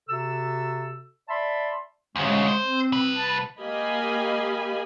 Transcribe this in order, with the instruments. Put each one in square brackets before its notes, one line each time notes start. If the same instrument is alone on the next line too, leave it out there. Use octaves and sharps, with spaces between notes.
[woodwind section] C3 F#4 A4 E6
D5 E5 A5 B5 C6
[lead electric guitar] D2 C#3 [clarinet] G#3
[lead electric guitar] C5
[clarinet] C4
[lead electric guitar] C2 B4
[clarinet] A5
[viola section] A#3 G4 D#5 F5 G#5 B5